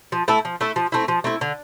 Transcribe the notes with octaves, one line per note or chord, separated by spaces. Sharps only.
F3
A3 E4 A4
F3
A3 E4 A4
F3
A3 C4 E4
F3
A3 C4 E4
D3